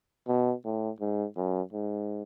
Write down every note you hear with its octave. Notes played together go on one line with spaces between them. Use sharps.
B2
A2
G#2
F#2
G#2